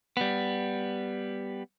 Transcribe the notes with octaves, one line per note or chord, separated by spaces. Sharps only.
G3 B3